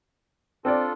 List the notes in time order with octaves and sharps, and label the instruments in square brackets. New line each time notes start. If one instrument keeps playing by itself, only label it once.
[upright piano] C4 D5 [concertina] D4 F4 A4